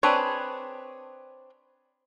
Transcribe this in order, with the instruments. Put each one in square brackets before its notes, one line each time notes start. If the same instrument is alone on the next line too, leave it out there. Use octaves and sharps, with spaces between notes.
[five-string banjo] C4 D4 G#4 B4 C#5